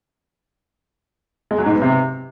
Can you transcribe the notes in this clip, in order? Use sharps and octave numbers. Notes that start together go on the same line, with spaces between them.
G#3
F#3
G#2
B3
C3